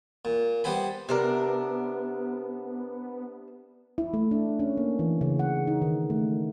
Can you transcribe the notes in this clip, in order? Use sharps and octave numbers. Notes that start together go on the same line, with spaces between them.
A#2
G3 B3 C5 G#5 B5
C3 B3 D4 A#4
E4
A3
D4
C#4
A#3
E3
C#3
F#5
D#4
D#3
A3